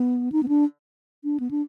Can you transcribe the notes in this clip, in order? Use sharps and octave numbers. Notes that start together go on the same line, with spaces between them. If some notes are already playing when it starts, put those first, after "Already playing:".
Already playing: B3
D#4
B3
D4
D4
B3
D4